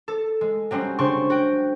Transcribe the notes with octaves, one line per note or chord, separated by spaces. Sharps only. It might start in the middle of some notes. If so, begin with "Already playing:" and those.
A4
G#3
F#3 G3 C4 C#4
C#3 D4 C5 C6 C#6
F#4 G5